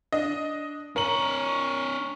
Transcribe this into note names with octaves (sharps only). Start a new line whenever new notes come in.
D4 D#5
D4 A#4 C#5 F#7